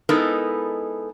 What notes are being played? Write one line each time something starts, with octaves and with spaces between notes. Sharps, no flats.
G#3 B3 D#4 E4 A4 A#4